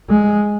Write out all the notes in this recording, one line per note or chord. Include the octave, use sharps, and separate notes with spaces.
G#3